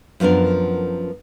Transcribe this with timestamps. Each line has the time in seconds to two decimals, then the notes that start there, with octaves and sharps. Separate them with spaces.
0.20 F#2 F3 B3 D4 A#4